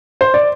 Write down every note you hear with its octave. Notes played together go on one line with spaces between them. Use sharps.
C5
D5